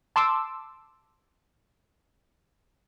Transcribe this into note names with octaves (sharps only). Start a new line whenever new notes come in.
A5 C6 D6 E6